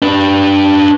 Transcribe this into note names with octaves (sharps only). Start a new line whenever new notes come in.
D4 B4